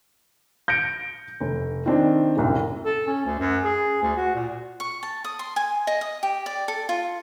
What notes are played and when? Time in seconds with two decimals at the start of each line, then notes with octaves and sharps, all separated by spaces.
0.68 G6 A#6 C#7 D7
1.40 F1
1.86 D#3 C4 D4
2.37 D#1 C2 F#2
2.85 A4
3.07 C#4
3.26 D2
3.39 F#2
3.64 G#4
4.02 D2
4.17 F#4
4.35 A#2
4.80 C#6
5.03 A5
5.24 D#6
5.39 C6
5.56 G#5
5.87 D#5
6.01 D#6
6.23 G4
6.46 D5
6.68 A4
6.89 F4